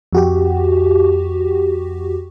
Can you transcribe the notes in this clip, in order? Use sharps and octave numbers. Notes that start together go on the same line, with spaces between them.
F2 F#4 G4